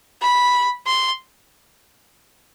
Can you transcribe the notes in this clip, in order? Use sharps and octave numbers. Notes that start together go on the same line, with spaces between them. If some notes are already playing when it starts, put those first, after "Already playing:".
B5
C6